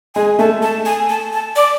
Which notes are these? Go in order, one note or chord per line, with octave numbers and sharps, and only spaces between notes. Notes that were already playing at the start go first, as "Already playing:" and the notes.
G#3 G#5
A3 A5
A5
G#5
A5
A5
D5